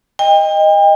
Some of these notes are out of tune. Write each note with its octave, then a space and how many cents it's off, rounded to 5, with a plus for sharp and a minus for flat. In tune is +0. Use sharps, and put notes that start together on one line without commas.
D#5 +0 G5 +35